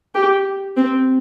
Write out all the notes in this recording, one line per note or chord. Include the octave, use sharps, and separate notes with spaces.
G4
C4